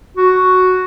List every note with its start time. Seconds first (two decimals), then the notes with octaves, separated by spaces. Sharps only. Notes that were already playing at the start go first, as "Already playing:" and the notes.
0.17 F#4